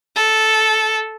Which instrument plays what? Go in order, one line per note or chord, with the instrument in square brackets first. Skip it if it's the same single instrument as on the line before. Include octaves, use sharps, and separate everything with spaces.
[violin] A4